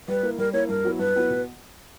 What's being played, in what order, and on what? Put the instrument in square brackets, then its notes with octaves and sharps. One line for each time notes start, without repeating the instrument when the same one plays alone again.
[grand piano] G3 [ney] B4
[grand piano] A#3 E4
[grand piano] G3 [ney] A#4
[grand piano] A#3 E4 [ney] C#5
[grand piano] G2 [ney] A#4
[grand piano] F#3 B3 E4
[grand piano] G2 [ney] B4
[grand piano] F#3 B3 E4
B2